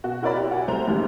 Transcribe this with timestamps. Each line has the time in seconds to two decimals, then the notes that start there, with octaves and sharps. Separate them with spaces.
0.04 B2 F#4
0.22 E4 F#4 A#4 C#5 D5 B5
0.37 E4 G4
0.51 F#4 F#5 G#5
0.68 C2 G3 A3 C5 A#5 F7
0.87 A1 D#2 A2 D#3 G3 G#3